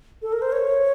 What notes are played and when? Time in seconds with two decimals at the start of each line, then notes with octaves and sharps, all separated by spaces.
0.22 A4
0.33 A#4
0.42 C5
0.52 C#5